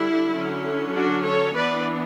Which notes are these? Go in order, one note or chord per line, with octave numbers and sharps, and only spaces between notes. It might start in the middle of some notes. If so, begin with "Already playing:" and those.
Already playing: D3 G3 D4 E4
D3 F#3 C#4
D4 F#4
A4 C#5
E3 B3 D4 B4 D5